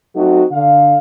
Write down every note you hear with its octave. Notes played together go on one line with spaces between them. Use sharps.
F#3 A3 C4 D#4 F#4
D3 F5